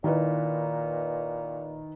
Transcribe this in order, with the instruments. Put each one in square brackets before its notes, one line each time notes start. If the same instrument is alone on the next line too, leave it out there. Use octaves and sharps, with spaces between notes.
[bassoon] A#2 [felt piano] D#3 E4 B4